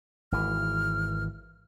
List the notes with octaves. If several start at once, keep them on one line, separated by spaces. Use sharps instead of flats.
G#1 E3 F6